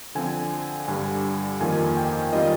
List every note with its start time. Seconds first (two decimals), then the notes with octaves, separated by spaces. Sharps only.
0.15 D3 F3 C4 G#5
0.88 G2 D3 G3 G#5
1.61 F2 D#3 A#3 F4 G#5
1.97 G5
2.32 D#3 G3 C4 F4 D#5